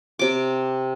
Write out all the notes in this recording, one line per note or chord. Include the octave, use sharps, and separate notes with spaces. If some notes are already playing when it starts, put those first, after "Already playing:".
C3 D6